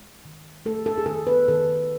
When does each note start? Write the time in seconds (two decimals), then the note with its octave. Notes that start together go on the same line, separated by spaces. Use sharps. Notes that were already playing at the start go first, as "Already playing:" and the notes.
Already playing: G#3
0.25 D#3
0.66 A3 A4
0.86 A4
0.98 G#4
1.06 D#3 A4
1.27 B4
1.48 D#3 A4